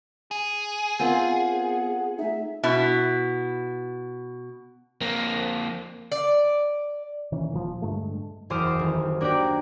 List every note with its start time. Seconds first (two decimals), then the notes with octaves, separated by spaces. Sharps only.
0.31 G#4
0.99 B3 C4 F4 A#4 F5 F#5
2.19 A3 D#4 E5
2.63 B2 E4
5.01 F2 A#3
6.12 D5
7.32 A#2 D#3 E3 C#4
7.52 D#1 A#2 D#3 F3
7.82 G2 D3 G#3 A3
8.50 F#1 E2 C5 D6 D#6 F6
8.79 D#1
9.21 A#3 D4 F#4 G4 D5